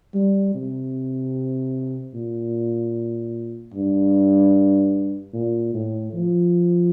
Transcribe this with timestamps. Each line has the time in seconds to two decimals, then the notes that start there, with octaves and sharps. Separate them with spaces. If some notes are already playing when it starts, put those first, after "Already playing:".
0.14 G3
0.54 C3
2.14 A#2
3.74 G2
5.33 A#2
5.74 A2
6.13 F3